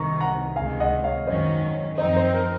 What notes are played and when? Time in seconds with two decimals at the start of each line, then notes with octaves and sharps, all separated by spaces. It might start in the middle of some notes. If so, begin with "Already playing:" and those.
Already playing: C2 C3 D#3 A#5 C#6
0.21 F#5 A#5
0.56 C#2 C3 D#3 G#3 F5 G#5
0.80 D#5 F#5
1.04 C#5 F5
1.27 G#1 F#2 D#3 F#3 C#4 C5 D#5
1.98 F#2 F3 C4 D#4 C5 D#5
2.16 C5
2.34 A#4